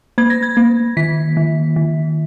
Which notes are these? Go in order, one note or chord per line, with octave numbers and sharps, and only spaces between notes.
A#3 G#6
A#6
G#6
A#3
D#3 B6
D#3
D#3